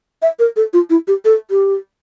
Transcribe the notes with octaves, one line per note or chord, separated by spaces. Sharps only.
E5
A#4
A4
F4
E4
G4
A4
G4